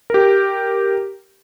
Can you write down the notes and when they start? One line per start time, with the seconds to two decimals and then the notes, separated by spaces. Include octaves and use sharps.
0.10 G4 A#4